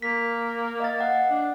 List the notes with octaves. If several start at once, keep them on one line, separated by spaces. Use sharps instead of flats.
A#3 B6
D#5 F5 A6
D#5 F#5
D4